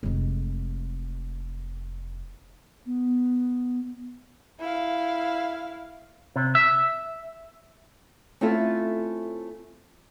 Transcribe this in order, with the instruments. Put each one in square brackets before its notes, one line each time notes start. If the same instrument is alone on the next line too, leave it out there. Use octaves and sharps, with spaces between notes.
[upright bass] F1 G#3
[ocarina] B3
[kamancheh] E4 F5
[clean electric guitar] C3
E5
[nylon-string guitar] A3 C4 C#4 E4 F4 A4